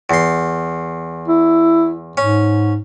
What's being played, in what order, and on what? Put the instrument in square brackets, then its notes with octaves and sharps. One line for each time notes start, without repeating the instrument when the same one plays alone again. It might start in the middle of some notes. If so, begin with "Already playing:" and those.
[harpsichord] E2 C6
[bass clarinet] E4
[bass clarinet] G#2 [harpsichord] C#4